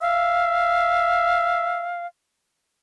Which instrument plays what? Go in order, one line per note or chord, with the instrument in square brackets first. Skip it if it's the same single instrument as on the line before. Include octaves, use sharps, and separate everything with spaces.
[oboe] E5 [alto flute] F5